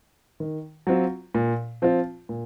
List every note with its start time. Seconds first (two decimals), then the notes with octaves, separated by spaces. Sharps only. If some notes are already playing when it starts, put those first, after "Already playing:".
0.40 D#3
0.87 F#3 C4 F4
1.35 A#2
1.82 F3 C4 F4
2.29 A#2